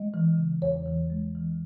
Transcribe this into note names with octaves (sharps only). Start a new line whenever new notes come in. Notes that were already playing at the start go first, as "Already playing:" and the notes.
Already playing: G#3 D#5
E3
C#3
E2 C#5
E3
G#3
E3